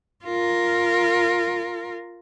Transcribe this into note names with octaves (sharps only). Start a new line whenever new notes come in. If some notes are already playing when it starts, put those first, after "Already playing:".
F4 A#4